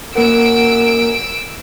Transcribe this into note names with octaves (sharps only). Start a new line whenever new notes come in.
F#2 A#3 B4 F#5 E6 D7